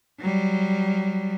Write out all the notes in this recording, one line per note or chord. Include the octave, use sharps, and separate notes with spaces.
F#3 G3